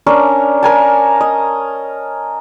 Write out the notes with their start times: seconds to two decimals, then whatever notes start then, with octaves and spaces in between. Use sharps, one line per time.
0.06 C#4 D4 A#4 C#5
0.63 A#4 G#5 A5
1.21 D#5